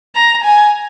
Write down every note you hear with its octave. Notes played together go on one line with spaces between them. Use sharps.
A#5
G#5